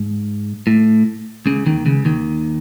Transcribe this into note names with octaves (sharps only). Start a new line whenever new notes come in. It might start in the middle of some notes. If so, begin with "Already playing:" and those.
Already playing: G#2
A2
C#2 C#3
D#2 D#3
C#2 C#3
D#2 D#3